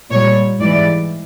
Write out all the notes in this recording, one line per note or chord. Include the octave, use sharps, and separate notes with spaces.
A#2 G3 C#5
G#2 E3 G3 D5